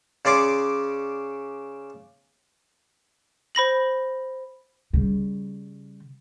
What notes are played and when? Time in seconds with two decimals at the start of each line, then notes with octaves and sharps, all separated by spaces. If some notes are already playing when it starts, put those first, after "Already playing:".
0.25 C#3 C#4 D5 C6 D6
3.55 C5 B5 A#6 F#7
4.93 C#3 G3